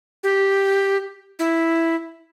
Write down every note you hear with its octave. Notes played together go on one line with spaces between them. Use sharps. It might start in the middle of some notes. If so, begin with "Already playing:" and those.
G4
E4